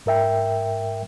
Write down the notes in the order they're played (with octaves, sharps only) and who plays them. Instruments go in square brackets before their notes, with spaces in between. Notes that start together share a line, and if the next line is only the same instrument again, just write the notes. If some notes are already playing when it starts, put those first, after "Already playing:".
[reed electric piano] G#2 A#4 E5 G5